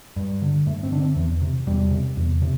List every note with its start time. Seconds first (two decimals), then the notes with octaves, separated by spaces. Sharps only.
0.16 G2
0.42 D3
0.67 G2 A3
0.83 C4
0.92 D3 D4
0.99 C4
1.16 E2 E3
1.41 C3
1.67 E2 G3
1.91 C3
2.17 E2
2.42 C3